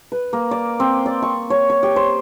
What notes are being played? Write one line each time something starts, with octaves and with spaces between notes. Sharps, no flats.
B4
A#3
D5
C4
D5
C#6
C#5
C#5
G4
C5